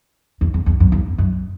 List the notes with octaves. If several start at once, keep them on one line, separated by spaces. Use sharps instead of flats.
E2
E2
E2
F#2
E2
F#2